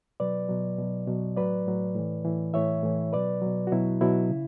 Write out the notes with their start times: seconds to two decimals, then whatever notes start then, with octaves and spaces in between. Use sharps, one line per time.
0.20 B2 F#3 B4 D5
0.49 B2 F#3
0.78 B2 F#3
1.08 B2 F#3
1.36 A2 F#3 B4 D5
1.67 A2 F#3
1.96 A2 E3
2.25 A2 E3
2.54 A2 E3 C#5 E5
2.83 A2 E3
3.13 B2 F#3 B4 D5
3.42 B2 F#3
3.67 F#4
3.72 B2 F#3 E4
4.01 B2 F#3 E4
4.30 C#3